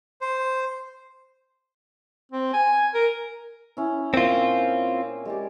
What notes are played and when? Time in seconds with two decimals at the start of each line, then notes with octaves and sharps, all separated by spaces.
0.21 C5
2.32 C4
2.54 G#5
2.94 A#4
3.77 C#4 E4
4.14 A#2 C4 F4
5.25 G#3 G4 D5